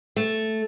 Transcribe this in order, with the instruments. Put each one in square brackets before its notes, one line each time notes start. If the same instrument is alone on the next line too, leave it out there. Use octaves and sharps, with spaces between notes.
[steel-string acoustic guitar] A3